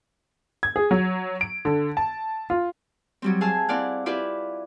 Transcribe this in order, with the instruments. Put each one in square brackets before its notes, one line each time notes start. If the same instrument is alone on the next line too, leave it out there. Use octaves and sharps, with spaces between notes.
[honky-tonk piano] G#6
G#4
F#3
D7
D3
A5
F4
[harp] F#3 G3 C4
G#4 F5 G#5 A5 E6
C4 E4 D5 F5 F#5
E4 F4 G4 B4 D5 E5